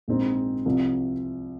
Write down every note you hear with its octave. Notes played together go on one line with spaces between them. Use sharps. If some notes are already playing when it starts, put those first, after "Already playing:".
A#1 G#2 G#3 C4 D#4
C2 C3 F3